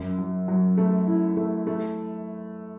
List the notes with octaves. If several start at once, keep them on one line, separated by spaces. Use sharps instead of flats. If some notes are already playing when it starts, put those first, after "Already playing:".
Already playing: F#2
F#3
F#3
A3
E4
A3
A3